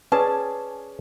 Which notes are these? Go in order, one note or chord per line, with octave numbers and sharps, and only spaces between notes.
C#4 G#4 B4 D5 A5